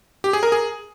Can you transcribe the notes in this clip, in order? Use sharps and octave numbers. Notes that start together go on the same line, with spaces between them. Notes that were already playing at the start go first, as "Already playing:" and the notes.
G4
G#4
A#4
G#4